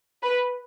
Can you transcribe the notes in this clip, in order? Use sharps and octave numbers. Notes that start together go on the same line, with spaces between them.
B4